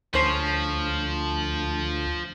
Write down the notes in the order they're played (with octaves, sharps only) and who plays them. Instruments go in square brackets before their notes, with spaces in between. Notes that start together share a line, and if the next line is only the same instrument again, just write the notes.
[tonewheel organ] D2 [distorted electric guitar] F3 [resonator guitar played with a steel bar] C#4 C5